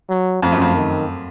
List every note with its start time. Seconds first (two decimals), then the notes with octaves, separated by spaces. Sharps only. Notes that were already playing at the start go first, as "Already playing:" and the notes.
0.10 F#3
0.42 F2 F3
0.52 F#2
0.61 F2
0.75 D#3